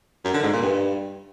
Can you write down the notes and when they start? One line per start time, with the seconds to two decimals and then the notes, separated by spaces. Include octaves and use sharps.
0.24 F#2
0.34 D3
0.43 G#2
0.53 A#2
0.62 G2